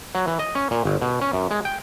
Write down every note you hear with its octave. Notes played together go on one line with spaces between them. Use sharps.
F#3
E3
D#5
C#4
A#2
G1
B2
C#4
F#2
G#3
G5